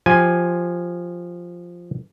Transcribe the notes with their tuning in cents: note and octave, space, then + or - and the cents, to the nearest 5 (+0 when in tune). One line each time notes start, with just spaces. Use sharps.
F3 +0 G4 +5 G#5 +0